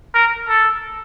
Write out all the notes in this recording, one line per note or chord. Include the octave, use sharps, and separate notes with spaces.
A#4
A4